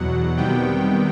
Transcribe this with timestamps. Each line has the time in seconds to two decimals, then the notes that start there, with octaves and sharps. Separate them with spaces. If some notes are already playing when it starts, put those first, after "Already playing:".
Already playing: E2 B2 F#3 F#5
0.37 C3 D#3 G3 B3 G5